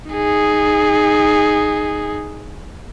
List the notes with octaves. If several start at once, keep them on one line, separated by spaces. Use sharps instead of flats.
D#4 G#4